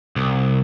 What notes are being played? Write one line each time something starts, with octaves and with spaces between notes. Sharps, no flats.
C2